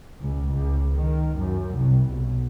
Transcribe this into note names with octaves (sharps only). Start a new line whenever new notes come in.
C#2
C#2
D#3
F#2
C2
B1